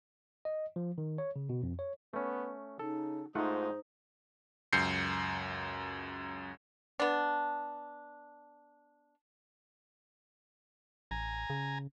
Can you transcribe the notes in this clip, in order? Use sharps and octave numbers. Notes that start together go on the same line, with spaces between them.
D#5
F3
D#3
C#5
C#3
B2
F2
C#5
A3 B3 C#4
C#3 D#4 A4
G#2 A3 D#4 F4 C5 F#5
C#2 F#2 G6 C7 C#7
B3 D4
A1 G#5 A#5
C#3